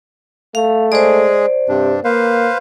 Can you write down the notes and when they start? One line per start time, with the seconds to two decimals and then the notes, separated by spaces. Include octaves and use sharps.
0.55 A3 F5
0.92 G#3 G#4 C5 D5
1.69 G2 C3 D4
2.05 A#3 B4 C5 F5